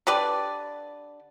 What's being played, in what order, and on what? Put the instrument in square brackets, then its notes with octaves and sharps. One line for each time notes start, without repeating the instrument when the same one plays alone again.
[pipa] D3 G4 B4 D5